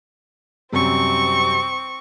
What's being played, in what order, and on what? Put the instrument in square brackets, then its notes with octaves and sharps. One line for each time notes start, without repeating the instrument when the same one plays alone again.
[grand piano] F#2 C3 G3 [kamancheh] C4 C#6